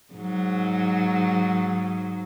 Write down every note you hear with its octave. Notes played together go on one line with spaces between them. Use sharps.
G#2 F#3